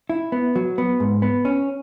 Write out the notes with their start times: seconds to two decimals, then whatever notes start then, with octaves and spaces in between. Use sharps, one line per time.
0.09 E4
0.32 B3
0.56 F#3
0.78 B3
1.00 G#2
1.22 B3
1.45 C#4